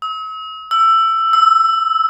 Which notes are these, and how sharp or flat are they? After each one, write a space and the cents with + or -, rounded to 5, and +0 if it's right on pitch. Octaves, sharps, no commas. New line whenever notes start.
E6 -45
E6 +15
E6 -15